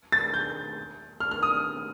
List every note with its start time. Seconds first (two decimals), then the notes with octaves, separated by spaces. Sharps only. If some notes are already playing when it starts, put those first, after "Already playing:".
0.12 A6
0.34 G6
1.20 F6
1.31 F6
1.43 D#6